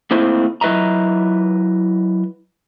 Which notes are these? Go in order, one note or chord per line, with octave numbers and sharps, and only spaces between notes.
A3 A#3 C4 D#4 E4 C5
F#3 E4 B4 D#5 E5 A#5